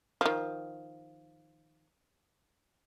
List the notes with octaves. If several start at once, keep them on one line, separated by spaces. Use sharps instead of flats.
D#3 F3